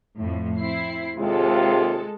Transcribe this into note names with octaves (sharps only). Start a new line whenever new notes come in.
F2 A2
C4 E4 C7
D#2 C3 G#3 F4 A4